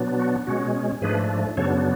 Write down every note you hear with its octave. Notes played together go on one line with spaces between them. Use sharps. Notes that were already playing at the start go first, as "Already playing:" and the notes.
Already playing: B2 F#3 B3 D4
F#4
B2 G#3 C#4 F#4
G#2 F3 A3 D4 G#4 B4
F#2 C#3 F#3 B3 D4 A4 C#5